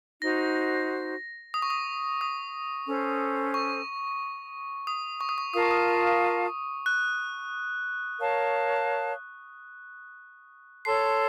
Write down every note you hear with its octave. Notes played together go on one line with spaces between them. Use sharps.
D#4 F#4 C5 A#6
D#6
C#6
D#6
D#6
C#4 A4 C5
C#6
D#6
C#6
D#6
C#6
F4 A#4 F5 A5 D#6
C#6
D#6
F#6
A#4 C#5 F5 A5
A4 C#5 A5 C6 C7